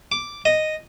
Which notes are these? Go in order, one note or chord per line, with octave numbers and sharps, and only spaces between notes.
D6
D#5